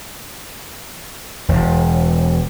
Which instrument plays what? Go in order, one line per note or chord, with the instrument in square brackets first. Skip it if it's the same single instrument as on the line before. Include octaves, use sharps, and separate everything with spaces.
[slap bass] E1